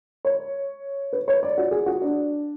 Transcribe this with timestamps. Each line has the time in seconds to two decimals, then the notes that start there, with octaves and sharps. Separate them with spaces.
0.25 C#5
1.13 B4
1.28 C#5
1.43 D5
1.58 F#4
1.71 G#4
1.86 F#4
2.02 D4